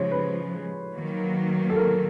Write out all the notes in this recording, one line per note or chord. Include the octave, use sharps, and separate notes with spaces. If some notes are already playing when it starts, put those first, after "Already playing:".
Already playing: C#3 F3 G#3 C5 C#5
B4
D#3 F#3 A#3
A4
A#4